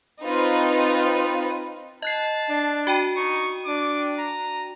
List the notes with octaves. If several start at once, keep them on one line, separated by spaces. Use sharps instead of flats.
C4 D#4 F4 B4
D#5 A5 F#6 C7
D4
F#4 G5 D#7
D#4 C#6
D4 D6
A#5